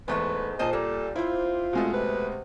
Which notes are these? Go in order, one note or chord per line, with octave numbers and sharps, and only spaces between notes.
E2 G#2 G#3 A3 B4 E5
A#2 C5 D#5 A5
G3 A#3 A4
C4 E4 F4 C5
B2 G#3 A3
C3 B4